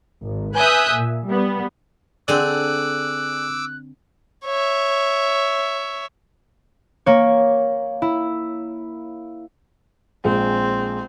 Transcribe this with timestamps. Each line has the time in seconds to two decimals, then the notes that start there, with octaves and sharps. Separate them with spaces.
0.23 G#1
0.55 B4 E5 G#5 D#6 F#6 G6
0.95 A#2
1.27 G3 B3
2.28 D3 C4 G#4 D5 D6 E6 F#6
4.45 C#5 E5
7.06 A#3 C#5
8.02 E4
10.25 A#1 G#3 C4